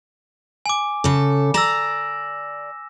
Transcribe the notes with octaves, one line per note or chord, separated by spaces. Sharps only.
G#5 D6
C#3 A4
D5 A#5 E6 A#6 E7